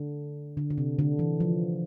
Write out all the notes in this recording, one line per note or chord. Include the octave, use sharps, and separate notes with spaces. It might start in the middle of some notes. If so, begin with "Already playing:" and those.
Already playing: D3
D3
D3
C3
D3
E3
F3